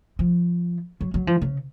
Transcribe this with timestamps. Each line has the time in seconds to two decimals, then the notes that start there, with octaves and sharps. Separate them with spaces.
0.19 F3
1.01 F#3
1.14 F#3
1.27 F3
1.42 C#3